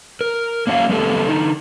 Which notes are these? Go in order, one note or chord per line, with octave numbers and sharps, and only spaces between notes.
A#4
A#3 C#4 F#4 E5 F5
G3 A3 A#3 C4 G4 A4
D3 D#4